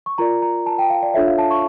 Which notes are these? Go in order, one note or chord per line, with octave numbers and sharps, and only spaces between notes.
C#6
F4 A#4 D5 A#5
A#5
A5
G5
F5
D5
D4 F4 A4 C#5 E5
F5
A5
C#6